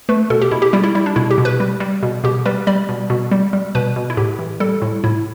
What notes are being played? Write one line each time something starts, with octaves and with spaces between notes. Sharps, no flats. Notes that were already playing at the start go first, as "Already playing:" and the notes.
A3 B4
B2 A4
G4
B2 E4
G4
G3 E4
E4
G3 E4
D4
B2 E4
G4
B2
B4
G3
G3
B2
B2 G4
G3 B4
G3 D5
B2
B2
G3
G3
B2 B4
B2
E4
A2 G4
E3
G3 A4
A2
A2 E4